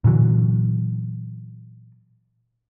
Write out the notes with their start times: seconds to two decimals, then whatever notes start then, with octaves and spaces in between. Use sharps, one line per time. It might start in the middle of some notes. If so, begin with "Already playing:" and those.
0.04 A#2 D3 E3 F#3